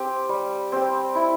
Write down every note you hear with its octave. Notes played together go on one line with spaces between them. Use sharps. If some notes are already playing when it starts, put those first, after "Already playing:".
Already playing: C4 G4
G3
C4 G4
E4